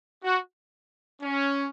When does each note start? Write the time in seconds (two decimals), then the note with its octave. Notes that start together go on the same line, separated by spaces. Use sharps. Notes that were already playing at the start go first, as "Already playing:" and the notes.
0.23 F#4
1.22 C#4